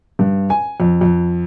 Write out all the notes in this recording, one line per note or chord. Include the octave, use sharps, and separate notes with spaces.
G2
G#5
F2
F2